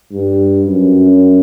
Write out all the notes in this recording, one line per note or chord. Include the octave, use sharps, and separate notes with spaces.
G2
F#2